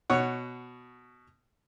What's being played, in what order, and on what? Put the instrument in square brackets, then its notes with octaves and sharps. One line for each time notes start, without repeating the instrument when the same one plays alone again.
[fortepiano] B2 C#5 F#5